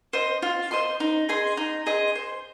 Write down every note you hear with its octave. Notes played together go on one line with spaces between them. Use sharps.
C5 D#5 C6
F4
C5 D#5 C6
D#4
G#4 D#5 C6
D#4
G#4 D#5 C6
C5